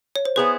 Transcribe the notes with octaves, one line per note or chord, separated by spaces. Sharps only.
C#5
C5
B3 E4 G#4 B4 C5